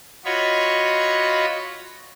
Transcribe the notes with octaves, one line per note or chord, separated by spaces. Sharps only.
F4 F#4 C#5 D#5 B5 C#6